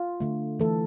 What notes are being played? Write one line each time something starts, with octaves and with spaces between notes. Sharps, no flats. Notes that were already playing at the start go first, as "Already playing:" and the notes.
Already playing: F4
D3 A3
E3 A3 A4